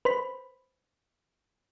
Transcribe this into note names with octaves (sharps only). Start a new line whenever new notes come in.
B4 C5 B5